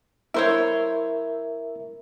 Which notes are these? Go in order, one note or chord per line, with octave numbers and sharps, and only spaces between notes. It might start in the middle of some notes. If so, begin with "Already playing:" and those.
E4 A#4 C5 C#5 E5